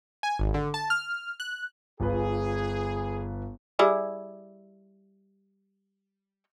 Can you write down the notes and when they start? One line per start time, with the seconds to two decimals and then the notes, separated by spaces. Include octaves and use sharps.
0.23 G#5
0.39 G#1
0.54 D3
0.74 A5
0.90 F6
1.40 F#6
2.00 G1 F4 G#4 B4
3.79 G3 E4 G#4